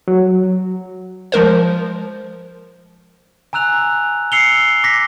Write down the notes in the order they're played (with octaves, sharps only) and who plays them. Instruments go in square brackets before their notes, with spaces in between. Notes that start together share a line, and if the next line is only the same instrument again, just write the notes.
[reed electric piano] F#3
[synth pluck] F3 G#3 A#4 C5
[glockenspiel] G#5 A#5 E6 F#6 F7
E6 C7 C#7 F7 G7
D6 A#6 B6